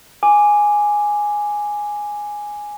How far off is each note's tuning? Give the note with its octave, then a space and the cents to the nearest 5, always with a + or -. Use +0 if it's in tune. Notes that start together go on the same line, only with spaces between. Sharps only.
G#5 +0 D6 +0